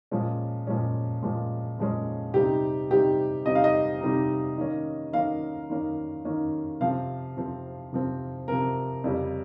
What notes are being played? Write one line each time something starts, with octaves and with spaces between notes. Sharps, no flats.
A#2 F3 G#3 C#4
A#2 F3 G#3 C#4
A#2 F3 G#3 C#4
A#2 F3 G#3 C#4
C3 G3 C4 D#4 G4
C3 G3 C4 D#4 G4
C3 G3 C4 D#4 D#5
F5
D#5
C3 G3 C4 D#4
D#3 A#3 C#4
D#3 A#3 C#4 F5
D#3 A#3 C#4
D#3 A#3 C#4
C3 F3 C4 F5
C3 F3 C4
C3 F3 C4
C3 F3 C4 A#4
F2 C#3 G3 C#4